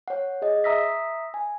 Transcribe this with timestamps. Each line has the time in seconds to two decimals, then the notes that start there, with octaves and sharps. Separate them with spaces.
0.08 C#5 F#5
0.42 G#4 D#5
0.64 E5 A#5 D#6 E6 A#6 B6
1.34 G#5